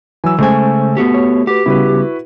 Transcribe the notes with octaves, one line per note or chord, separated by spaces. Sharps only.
E3 F#3 G#5 E6
C#3 G#3 A3 C#4 C5 G#5
B3 F#4 G4
C#5
F#4 G4 B4
C#3 G3 B3 E4 F#4 B4